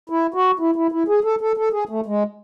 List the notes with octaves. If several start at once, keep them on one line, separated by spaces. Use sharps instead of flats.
E4
F#4
E4
E4
E4
G#4
A4
A4
A4
G#4
A3
G#3